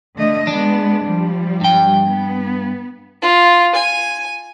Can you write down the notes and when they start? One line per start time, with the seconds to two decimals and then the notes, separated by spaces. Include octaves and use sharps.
0.17 D3 A3 D#5
0.47 G#3 B3 D4
1.04 F3 G3
1.61 G2 G5
2.05 B3
3.22 F4
3.75 G#5